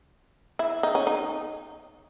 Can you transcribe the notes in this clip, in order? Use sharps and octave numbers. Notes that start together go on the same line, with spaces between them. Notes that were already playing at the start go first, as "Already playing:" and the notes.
E4
D#4
C#4
D#4